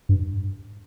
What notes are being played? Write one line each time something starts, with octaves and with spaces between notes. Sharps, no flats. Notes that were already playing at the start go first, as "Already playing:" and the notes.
G2